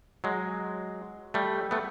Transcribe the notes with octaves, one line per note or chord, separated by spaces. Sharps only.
F#3 G#3
G3 A3
A3 B3